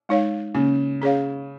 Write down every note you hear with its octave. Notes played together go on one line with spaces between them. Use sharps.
G#3 D#4 C#5 F5
C#3 A#3
C#4 G#4 C#5 F5